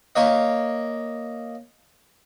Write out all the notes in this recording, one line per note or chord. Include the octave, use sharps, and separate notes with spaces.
A#3 C#5 D#5